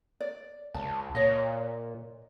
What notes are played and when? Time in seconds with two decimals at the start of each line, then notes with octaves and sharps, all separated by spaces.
0.20 D5
0.74 C#2 A5
1.15 A#2 C#5 D#5